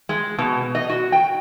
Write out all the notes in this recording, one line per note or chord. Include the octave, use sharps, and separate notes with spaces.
G#3
B2
D#5
F#4
G5